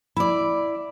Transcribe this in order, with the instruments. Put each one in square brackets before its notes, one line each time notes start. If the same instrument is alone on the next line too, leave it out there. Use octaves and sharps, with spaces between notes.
[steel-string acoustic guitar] E4 D5 [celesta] B5